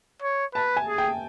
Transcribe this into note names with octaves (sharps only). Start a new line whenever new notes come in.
C#5
B4 A5
G#5
G#4
G5